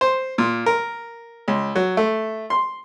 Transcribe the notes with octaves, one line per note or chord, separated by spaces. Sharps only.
C5
A#2
A#4
C#2
F#3
A3
C6